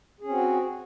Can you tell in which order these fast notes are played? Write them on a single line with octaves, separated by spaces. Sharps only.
G#4 C#4 C4 F#4